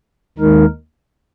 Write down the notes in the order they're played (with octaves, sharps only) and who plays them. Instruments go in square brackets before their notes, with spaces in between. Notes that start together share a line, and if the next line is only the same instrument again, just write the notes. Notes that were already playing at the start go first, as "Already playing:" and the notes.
[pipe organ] D#2 D#3 G#3 D#4 A#4